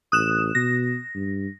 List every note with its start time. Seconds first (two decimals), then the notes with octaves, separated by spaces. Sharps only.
0.12 A1 D#6 F#6 E7
0.55 B2 A#6
1.15 G2